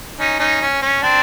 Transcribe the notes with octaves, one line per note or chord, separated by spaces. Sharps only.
C#4 D#4
C#4 D#4
C#4
C#4
C4 D4